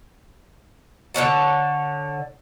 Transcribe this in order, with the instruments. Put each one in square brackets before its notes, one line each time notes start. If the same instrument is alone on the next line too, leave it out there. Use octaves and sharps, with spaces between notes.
[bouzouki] D3 B4 C#5 A5